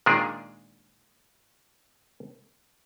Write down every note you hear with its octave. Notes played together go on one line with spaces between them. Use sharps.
A#2 D#3 G#3 D4 G#4